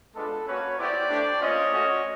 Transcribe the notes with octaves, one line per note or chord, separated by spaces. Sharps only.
G#3 B3 D4 F4 A4 B4
A#3 C#4 F#4 B4 C#5
B3 E4 G4 C5 D5
A3 D4 G4
A#3 C#4 F4 C#5 D#5
A3 C#4 F#4